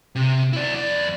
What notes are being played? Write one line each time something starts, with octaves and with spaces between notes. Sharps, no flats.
C3
E4 D5
F2 D5